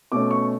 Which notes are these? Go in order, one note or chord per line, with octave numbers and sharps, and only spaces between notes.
B2 A3 C#4 D6
C#6